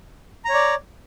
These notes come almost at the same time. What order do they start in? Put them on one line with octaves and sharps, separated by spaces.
A#5 C#5 D5